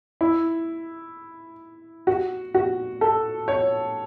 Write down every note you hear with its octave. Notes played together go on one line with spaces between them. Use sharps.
E4
F#4
F#4
A4
C#5